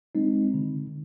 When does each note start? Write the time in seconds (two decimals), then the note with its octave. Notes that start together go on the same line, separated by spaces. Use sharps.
0.15 G#3 C4 D#4
0.54 D3